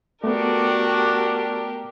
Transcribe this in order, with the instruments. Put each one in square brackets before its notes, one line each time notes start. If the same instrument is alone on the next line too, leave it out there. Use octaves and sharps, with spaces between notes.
[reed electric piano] A3 B3 [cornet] D4 [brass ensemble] F#4 [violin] G4 A#4